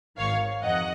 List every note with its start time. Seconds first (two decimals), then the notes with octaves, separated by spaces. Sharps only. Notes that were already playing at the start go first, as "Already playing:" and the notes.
0.17 G#1 G#2 D#3 C#5 F5
0.62 F2 C3 D#3 D#5 F#5